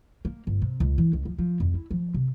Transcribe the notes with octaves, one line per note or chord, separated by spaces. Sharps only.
A#3
G1
C3
C#2
E3
C#2
F3
F3
F2
E4
F3
C3